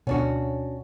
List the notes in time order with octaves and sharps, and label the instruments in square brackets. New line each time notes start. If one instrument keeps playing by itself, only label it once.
[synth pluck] D2 B2 [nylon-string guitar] C#4 D4 F#4